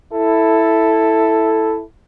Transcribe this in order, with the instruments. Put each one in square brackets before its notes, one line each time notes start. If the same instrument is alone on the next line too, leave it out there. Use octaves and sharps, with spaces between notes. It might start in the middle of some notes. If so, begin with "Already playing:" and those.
[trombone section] E4 A4